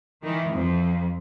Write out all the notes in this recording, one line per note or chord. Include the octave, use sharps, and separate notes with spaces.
D#3 E3
F2